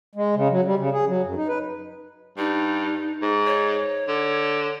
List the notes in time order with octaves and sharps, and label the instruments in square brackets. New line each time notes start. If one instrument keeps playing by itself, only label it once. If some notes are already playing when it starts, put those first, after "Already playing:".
[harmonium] G#3
C#3
F#3
G3
C#3
G#4
F#3
F#2
D#4
B4
[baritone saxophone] G2 [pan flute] D#4
[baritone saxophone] G#2
[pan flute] C#5
[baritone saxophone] D3